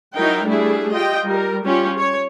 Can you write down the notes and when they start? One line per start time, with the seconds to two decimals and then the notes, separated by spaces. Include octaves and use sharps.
0.15 F#3 D#4 E4 A#4 G5
0.45 G3 A3 D4 E4 G#4
0.91 F4 G4 D#5 G5
1.24 G3 A#4
1.64 G3 C#4 F4 G4
1.96 C#5